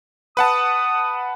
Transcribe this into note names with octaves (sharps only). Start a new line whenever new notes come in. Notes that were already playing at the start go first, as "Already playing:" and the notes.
B4 F#5 A5 D#6